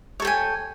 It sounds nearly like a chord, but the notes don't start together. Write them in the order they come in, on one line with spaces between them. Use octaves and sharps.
C#5 A4 G5 G#5